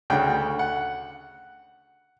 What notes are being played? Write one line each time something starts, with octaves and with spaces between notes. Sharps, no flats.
D2 C#3 G5
F#5